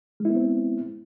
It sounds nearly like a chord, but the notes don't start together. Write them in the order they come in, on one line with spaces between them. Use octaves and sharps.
G#3 E4 B3 C4